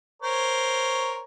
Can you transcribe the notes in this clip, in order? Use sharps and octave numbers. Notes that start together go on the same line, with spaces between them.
A#4 C5 C#5